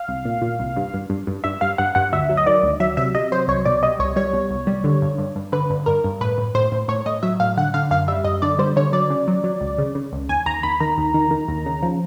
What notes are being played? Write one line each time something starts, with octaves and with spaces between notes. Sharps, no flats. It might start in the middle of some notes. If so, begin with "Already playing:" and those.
Already playing: F5
C2
A#2
A#2
C2
G2
G2
G2
G2
G2 E5
G2 F5
G2 F#5
G2 F#5
D2 E5
F#3
D#5
D#3 D5
D2
F#3 E5
C3 E5
C3 D#5
F#3 C5
C2 C#5
B2 D5
G3 D#5
C2 C#5
G3 C#5
B2
C2
G3
D3
G2
G2
G2
D3 B4
G2
G2 A#4
G2
A2 B4
A2
A2 C5
A2
A2 C#5
A2 D#5
F#3 E5
A2 F5
D3 F#5
D3 F5
F#2 F5
G3 E5
F#2 D#5
D3 D5
G3 C5
D3 C#5
F#3 D5
C#3
F#3
F#3
C#2
C#3
C#3
C#2
D#2 G#5
D#2 A#5
D#2 B5
D#3 A#5
D#2
D#3
D#3
D#2
C#3
F3